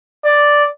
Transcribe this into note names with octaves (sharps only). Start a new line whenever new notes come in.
D5